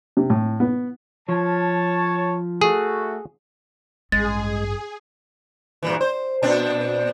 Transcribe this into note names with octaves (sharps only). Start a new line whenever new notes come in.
C3
A2
B3
F3 C#5 A5
A3 F#4 G#4
A1 G2 G#3 G#4 A6
G2 A#2 E3
C5
A#2 C4 D4